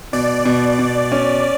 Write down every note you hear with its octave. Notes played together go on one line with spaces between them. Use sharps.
B2 D5
B2
B2
C#4